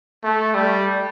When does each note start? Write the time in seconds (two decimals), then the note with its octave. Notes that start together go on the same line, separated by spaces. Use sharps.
0.23 A3
0.54 G3